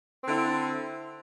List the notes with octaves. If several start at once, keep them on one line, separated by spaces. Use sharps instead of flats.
D3 C4 E4